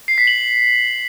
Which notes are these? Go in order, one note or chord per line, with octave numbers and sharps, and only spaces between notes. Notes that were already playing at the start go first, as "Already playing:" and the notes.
C7
B6
F#7